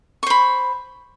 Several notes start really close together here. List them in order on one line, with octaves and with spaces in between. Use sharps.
C#6 C5 B5